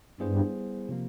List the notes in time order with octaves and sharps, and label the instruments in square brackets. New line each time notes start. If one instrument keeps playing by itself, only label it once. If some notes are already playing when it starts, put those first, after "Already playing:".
[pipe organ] G2 [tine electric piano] G3 B3 E4 G#4 C5
[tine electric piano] C3 F3 A#3